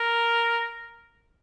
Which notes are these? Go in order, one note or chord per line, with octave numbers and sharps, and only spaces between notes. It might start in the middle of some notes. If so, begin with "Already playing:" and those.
Already playing: A#4